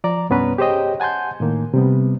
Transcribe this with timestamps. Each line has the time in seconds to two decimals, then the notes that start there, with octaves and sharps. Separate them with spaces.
0.04 F3 D5 A#5
0.30 C2 G2 B3 C#4 B4 A#5
0.58 G4 G#4 C5 C#5 D#5 G5
1.00 F#5 G#5 A5 C6 G6
1.40 A2 D#3 A#3
1.74 C3 G3 B3